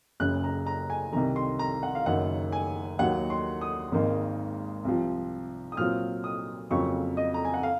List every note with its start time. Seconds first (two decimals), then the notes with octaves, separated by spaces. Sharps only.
0.20 F#1 F#2 C#3 F#6
0.44 A#5
0.67 A#5
0.90 G#5
1.12 C2 C3 D#3 A#5
1.36 C6
1.59 A#5
1.83 F#5
1.95 F5
2.06 F#1 F#2 D#3 F#5
2.52 G#5
2.99 D#2 D#3 F#3 F#5
3.30 C6
3.61 D#6
3.92 G#1 G#2 D#3 A#3
4.85 C2 C3 F3
5.72 D#6
5.77 A#2 F#3 C4 F4 F6
6.24 D#6
6.70 F2 C#3 F#3 A#3 F4 C#6
7.17 D#5
7.34 A#5
7.45 G#5
7.54 F#5
7.63 F5